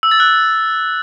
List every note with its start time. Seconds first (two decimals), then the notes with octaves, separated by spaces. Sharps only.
0.03 E6
0.11 A6
0.20 F#6